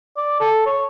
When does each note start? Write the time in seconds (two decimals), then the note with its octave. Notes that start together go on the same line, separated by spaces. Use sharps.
0.17 D5
0.40 A4
0.66 C#5